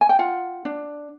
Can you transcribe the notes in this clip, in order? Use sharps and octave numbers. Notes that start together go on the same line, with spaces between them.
G#5
G5
F4 F#5
D4